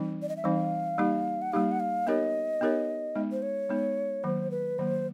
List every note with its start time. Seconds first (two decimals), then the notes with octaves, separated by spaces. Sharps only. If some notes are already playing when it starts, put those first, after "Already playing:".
Already playing: E3 G3 C4 D#4
0.22 D5
0.29 D#5
0.37 E5
0.44 E3 G3 C4 D#4 F5
0.98 G3 A#3 D#4 G4
1.42 F#5
1.52 G3 A#3 D#4 G4 F5
1.71 F#5
1.80 F5
2.07 B3 D#4 G4 A#4 C#5 D#5
2.61 B3 D#4 G4 A#4 C#5
3.15 G#3 B3 D#4
3.32 C5
3.42 C#5
3.70 G#3 B3 D#4
4.24 D#3 F#3 A#3 C5
4.51 B4
4.78 D#3 F#3 A#3 C5